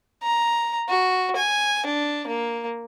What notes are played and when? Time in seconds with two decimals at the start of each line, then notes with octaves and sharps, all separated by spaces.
0.23 A#5
0.89 F#4
1.36 G#5
1.86 D4
2.27 A#3